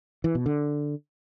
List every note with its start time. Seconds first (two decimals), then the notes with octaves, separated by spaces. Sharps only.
0.24 E3
0.35 B2
0.46 D3